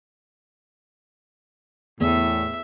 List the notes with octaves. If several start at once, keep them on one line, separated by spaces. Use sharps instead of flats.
E2 A2 E5